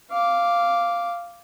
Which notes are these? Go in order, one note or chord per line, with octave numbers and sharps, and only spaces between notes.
F5 D6